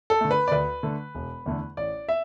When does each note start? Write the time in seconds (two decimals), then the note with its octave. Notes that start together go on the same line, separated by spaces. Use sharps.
0.10 A4
0.21 D3 A3
0.31 B4
0.48 D5
0.51 D2 B4
0.83 D3 A3
1.15 E1
1.46 E2 D3 A3
1.77 A1 D5
2.09 E5